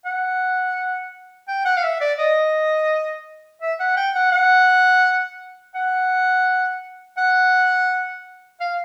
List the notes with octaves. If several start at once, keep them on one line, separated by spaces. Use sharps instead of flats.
F#5
G5
F#5
F5
E5
D5
D#5
E5
F#5
G5
F#5
F#5
F#5
F#5
F5